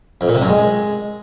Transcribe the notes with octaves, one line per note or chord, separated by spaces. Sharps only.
F2
A#2
C3
F#2
G#3